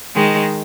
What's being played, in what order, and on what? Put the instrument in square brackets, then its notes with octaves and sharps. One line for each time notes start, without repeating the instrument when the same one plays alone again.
[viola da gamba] D#3 G#3